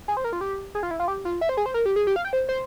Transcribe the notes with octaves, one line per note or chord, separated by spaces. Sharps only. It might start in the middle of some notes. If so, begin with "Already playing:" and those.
G#4
C5
A#4
F4
G4
G#4
F4
E4
F4
G4
F4
E5
C5
G#4
C5
A#4
G4
G#4
G4
F5
G5
C5
C5